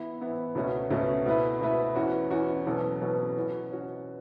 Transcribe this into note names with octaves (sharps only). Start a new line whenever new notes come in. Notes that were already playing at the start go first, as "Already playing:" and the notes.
Already playing: E3 B3 E4
E3 B3 E4
C#2 B2 A3 C#4 F#4
C#2 B2 A3 C#4 F#4
B2 A3 E4 B4
B2 A3 E4 B4
E2 E3 C#4 F#4
E2 E3 C#4 F#4
E2 B2 F#3 C#4 A4
E2 B2 F#3 C#4 A4
E3 C#4 F#4
E3 C#4 F#4